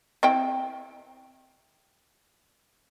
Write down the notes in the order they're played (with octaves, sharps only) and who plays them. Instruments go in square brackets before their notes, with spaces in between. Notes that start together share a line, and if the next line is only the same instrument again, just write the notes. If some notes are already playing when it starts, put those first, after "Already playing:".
[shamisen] C4 E4 G5